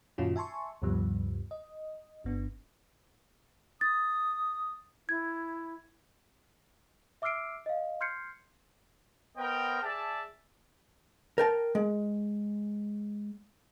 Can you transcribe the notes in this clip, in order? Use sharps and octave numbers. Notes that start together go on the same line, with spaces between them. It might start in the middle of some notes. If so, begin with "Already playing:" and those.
F#2 A#2 D#3 C#4 F4 F#4
E5 G#5 A5 C6 C#6
D2 G2 C3 F3 G3 B3
D#5
G1 B3 D4
D#6 A6
E4 G#6
E5 D6 E6 F6 C7 D7
D#5 F5
C6 F6 G6 G#6 C7 C#7
B3 A#4 C5 D#5 G5
G#4 D5 E5 A5
A#4 G5 A5
G#3